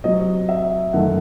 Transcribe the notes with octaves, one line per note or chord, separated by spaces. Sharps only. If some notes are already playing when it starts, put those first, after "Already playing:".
C3 F#3 C4 D#5
E5
F#2 D#3 A3 F#5